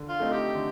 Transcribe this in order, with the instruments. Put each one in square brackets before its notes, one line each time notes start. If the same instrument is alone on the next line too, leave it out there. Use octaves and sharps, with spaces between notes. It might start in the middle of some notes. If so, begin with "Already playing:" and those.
Already playing: [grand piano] D3
[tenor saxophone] F4
[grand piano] A3 C4 D#4
[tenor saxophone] G4
[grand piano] D3